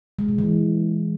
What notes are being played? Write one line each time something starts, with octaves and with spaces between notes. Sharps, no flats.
G#3
A#2
E3